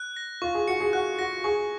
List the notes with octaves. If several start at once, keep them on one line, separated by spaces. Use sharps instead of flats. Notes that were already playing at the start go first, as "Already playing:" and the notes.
Already playing: F#6
A#6
F4 C#6
G#4
F#4 C#7
G#4
F#4 F#6
F#4 A#6
G#4 C#6